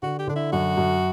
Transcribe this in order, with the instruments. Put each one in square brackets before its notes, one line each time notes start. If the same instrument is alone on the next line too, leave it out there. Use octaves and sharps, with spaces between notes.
[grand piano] D3 [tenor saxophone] F#4
[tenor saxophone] G4
[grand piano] D3 [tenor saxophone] D4
[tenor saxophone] E4
[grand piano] F#2 [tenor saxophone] F#4
[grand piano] F#2